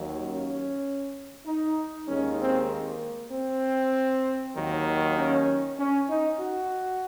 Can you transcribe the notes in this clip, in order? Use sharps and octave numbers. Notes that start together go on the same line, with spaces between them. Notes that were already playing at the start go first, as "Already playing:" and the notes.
Already playing: D#2 D#3 F#3
C#4
D#4
D#2 D#3 G#3 C#4
C4
A#3
C4
D#2 D#3 F#3
C#4
C#4
D#4
F#4